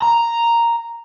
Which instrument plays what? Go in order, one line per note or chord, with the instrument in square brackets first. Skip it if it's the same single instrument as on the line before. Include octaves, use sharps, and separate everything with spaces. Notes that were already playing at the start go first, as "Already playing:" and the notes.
[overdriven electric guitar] A#5